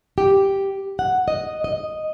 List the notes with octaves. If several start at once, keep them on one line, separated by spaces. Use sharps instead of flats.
G4
F#5
D#5
D#5